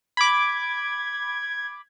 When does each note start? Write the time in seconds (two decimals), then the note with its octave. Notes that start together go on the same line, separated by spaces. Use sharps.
0.17 B5 D6 G#6